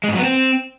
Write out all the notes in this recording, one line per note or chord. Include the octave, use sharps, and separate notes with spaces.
G#3
G#2
F#3
B3
C4